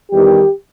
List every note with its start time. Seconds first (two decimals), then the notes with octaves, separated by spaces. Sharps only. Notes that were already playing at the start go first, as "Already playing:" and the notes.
0.10 E2 D#3 G3 G4